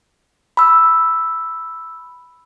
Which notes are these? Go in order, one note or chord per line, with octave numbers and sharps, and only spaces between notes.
B5 E6